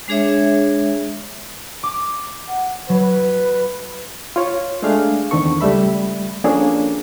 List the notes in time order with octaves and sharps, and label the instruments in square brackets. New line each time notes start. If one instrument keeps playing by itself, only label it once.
[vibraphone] G#3 D4 G#4 C#5 E5
[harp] D6
[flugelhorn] F#5
[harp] F#3 [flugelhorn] B4
[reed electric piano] F4 C#5
G#3 A3 D4 G#4 F5
E2 D3 D#3 C4 A4 C#6
C#2 G3 A3 E5 B5
F3 A#3 C#4 D4 G#4 A4